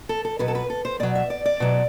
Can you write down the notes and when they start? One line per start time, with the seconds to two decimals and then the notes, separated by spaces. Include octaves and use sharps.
0.09 A4
0.25 A4
0.39 B2 F#3 B4
0.48 A4
0.55 B4
0.70 A4
0.85 C5
1.00 B2 F#3 D5
1.15 E5
1.30 D5
1.45 D5
1.60 B2 F#3